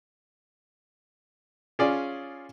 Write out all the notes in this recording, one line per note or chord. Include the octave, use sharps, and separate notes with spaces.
C#4 F4 G#4 D5